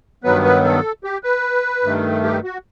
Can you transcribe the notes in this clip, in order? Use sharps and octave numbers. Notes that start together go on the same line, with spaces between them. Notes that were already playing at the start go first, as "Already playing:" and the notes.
G2 D#3 F#3 B3 B4
B4
A4
G4
B4
G2 D#3 A3
G4
F#4